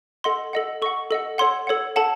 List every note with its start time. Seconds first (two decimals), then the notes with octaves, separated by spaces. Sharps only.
0.24 A4 D#5 F#5 C6
0.53 A4 D#5 F#5
0.82 A4 D#5 F#5 C#6
1.11 A4 D#5 F#5
1.38 A4 C#5 F#5 C6
1.67 A4 C#5 F#5
1.96 A4 C#5 F#5 A5